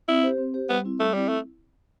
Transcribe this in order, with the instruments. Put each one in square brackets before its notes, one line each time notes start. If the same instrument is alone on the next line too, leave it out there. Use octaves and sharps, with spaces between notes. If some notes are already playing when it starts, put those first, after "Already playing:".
[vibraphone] C4 [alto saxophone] E4
[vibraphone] G4 C5
C4
G4 C5
[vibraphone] G3 [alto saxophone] B3
[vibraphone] C4 E4
[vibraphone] G3 [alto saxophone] A3
[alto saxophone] G3 [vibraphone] C4 E4
[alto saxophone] A3